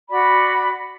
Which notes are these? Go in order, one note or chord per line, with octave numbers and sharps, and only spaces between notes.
F#4 D5 B5